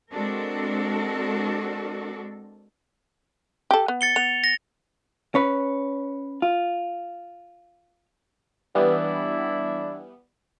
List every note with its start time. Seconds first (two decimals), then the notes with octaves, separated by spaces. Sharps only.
0.12 G#3 C4 D4 F#4 A4 A#4
3.71 G4 A4
3.88 B3
4.01 A6 C#7 G7
4.16 B3 F7
4.44 A#6
5.35 C#4 B4
6.42 F4
8.75 E3 G3 B3 D4 E4